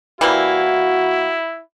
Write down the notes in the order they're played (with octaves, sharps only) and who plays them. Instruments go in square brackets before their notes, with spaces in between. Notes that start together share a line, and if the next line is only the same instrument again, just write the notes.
[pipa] E3 G3 A#3 [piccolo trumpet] E4 [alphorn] F#4